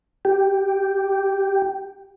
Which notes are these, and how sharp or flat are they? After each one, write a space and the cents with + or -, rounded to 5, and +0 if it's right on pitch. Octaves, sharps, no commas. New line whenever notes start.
G4 -5